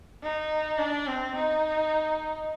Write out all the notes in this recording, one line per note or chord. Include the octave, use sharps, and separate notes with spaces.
D#4
D4
C4
D#4